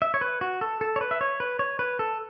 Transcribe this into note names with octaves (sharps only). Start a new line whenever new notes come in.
E5
C#5
B4
F#4
A4
A4
C#5
B4
E5
C#5
B4
C#5
B4
A4